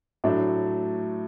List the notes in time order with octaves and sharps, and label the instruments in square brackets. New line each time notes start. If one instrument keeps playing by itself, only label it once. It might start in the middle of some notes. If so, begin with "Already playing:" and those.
[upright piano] A2 F#3 A3 D4